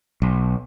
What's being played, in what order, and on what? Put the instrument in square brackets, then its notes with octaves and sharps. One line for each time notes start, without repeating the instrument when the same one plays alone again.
[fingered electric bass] B1